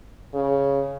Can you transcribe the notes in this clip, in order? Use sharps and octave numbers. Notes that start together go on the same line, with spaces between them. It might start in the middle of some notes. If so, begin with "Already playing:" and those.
C#3